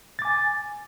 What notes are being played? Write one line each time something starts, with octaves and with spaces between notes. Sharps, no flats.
G#5 D6 A6